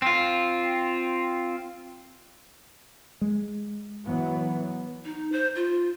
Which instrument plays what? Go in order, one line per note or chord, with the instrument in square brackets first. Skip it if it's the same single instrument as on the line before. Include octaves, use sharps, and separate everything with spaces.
[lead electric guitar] C4 F4
[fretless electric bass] G#3
[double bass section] E3 F#3 B3
[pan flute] D#4
C5
F4